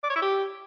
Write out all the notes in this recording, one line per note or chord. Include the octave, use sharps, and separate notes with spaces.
D5
C#5
E4
G4